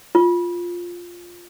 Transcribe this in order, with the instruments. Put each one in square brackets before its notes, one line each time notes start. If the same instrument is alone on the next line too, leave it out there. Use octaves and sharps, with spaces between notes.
[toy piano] F4